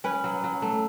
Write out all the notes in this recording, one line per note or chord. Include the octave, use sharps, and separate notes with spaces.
C#4 B4
F#3
F#3
A3